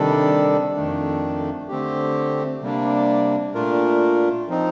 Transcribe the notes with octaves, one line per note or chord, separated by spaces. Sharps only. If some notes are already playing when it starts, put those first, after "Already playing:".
Already playing: C3 D#3 G3 D4 A4
F2 D#3 A3 D4
D3 A3 C4 G4
C3 G3 A#3 D4
A#2 A3 D4 F4 A#4
F3 C4 D#4